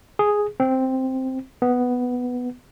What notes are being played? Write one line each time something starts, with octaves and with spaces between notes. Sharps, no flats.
G#4
C4
B3